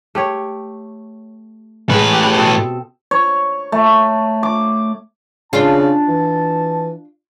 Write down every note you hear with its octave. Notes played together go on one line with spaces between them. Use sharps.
A3 G4 C#5
A2 G#3 C#4 B4
G4
B2 C4 A4
C#5
A3
D6
C#3 D4 F4 A5
E3